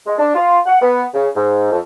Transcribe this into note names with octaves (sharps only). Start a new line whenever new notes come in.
G#3
D4
F4
F#5
B3
C#3
G#2
F2